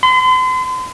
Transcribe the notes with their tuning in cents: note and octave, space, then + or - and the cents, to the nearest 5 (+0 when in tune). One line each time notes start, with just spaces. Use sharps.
C6 -40